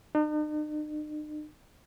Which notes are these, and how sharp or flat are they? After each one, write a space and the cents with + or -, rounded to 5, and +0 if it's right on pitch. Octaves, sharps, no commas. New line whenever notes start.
D#4 -45